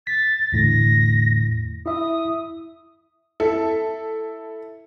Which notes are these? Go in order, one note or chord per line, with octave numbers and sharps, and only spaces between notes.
A6 B6
E2 A2 D3 A#6
E4 E5 D#6
E4 A4